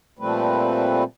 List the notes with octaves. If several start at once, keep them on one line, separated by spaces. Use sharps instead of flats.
A#2 F3 G3 A3 C4 B4